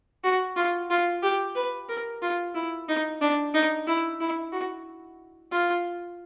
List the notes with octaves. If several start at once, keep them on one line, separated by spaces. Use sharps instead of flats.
F#4
F4
F4
G4
B4
A#4
F4
E4
D#4
D4
D#4
E4
E4
F#4
F4